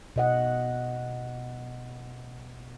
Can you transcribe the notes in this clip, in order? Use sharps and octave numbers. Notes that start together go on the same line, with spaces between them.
B2 D#5 F#5